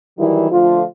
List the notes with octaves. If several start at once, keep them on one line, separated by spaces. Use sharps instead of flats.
D#3 E3 F#3 G3 E4
D3 F3 A3 F4